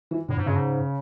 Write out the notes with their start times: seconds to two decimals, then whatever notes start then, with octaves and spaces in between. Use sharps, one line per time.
0.11 E3
0.28 A2 D3
0.37 G#2
0.46 G2 C#3
0.56 G#2